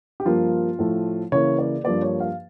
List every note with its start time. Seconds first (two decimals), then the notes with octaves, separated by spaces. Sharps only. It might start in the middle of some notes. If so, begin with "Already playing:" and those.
0.20 G4
0.25 G2 F3 A#3 F4
0.79 A2 F3 A3
1.32 C#3 E3 A#3 C#5
1.59 D5
1.84 G2 F3 A#3 D5
2.02 C#5
2.20 F5